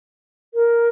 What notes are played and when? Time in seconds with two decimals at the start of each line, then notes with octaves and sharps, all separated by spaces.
0.54 A#4